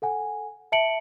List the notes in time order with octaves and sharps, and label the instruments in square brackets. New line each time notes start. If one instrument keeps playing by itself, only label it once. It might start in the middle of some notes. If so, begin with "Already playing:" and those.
[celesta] A4 F#5 G#5
E5 A5 C#7 D7 F#7